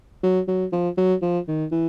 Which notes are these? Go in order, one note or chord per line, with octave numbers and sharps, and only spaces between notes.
F#3
F#3
F3
F#3
F3
D#3
E3